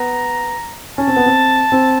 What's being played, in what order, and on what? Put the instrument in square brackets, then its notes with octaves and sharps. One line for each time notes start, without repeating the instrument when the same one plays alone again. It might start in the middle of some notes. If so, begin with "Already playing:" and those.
Already playing: [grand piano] B3 [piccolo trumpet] A#5
[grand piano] C#4 [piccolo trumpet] A5
[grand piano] C4
B3
C4
C4